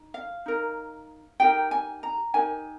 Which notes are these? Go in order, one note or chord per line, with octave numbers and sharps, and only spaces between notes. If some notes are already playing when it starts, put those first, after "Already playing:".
Already playing: D#4
F5
D#4 A#4
D#4 G4 A#4 G5
G#5
A#5
D#4 G4 A#4 G#5